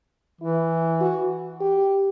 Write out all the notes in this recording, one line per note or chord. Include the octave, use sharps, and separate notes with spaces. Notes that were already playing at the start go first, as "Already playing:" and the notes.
E3 E4
F#4
G4